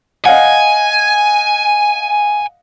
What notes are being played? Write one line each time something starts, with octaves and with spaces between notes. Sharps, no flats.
D#5 F5 F#5 G#5